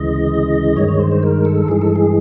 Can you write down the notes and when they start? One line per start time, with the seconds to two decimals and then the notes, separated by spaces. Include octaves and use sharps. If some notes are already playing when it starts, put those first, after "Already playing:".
Already playing: D2 C#3 E3 G#3 D#5
0.76 G2 D#3 G#3 C#5
0.88 C#5
1.00 C5
1.11 C5
1.23 A#4
1.45 A4
1.68 G2 E3 G#3 G#4
1.81 A4
1.96 G#4